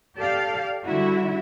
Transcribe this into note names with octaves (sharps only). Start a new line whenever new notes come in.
G4 A4 D5 F5
D3 G3 E4 F#4 E5